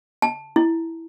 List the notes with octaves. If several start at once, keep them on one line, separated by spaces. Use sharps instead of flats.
A5
E4